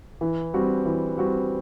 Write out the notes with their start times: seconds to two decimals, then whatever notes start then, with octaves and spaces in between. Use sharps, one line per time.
0.21 E3
0.54 G3 C4 F#4
0.85 E3
1.17 G3 C4 F#4